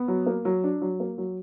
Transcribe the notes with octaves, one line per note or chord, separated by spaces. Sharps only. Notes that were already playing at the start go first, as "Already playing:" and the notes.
Already playing: B3
F#3
A#3
F#3
D4
F#3
A#3
F#3